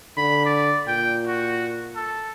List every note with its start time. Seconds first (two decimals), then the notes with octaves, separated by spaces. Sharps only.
0.18 D3 B5
0.46 D5
0.88 A#2 G5
1.28 F#4
1.96 A4